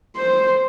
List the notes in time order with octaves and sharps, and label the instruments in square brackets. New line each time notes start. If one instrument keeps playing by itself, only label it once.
[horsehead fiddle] C5